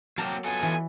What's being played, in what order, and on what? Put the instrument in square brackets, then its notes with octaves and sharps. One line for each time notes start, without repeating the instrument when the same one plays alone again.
[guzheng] F#3 A5 A#5 [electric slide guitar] A#3 C4 G4
[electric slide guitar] B3 F4 A4 [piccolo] G#5
[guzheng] E3